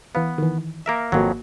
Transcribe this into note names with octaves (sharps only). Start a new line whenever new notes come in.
E3 B3 B4 F5
D#3 E3
A#3 A#4 E5
G#1 F2 F#3 A#3 F#4